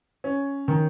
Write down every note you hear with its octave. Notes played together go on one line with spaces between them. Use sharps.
C#4
D#3